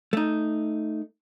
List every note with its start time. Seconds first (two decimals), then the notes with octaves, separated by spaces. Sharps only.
0.13 A3 D#4